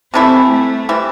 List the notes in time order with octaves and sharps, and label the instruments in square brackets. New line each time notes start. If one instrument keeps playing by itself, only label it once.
[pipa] C3 E3 A3 E4 [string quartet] C4
[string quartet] A3
[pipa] E3 G3 C4 E4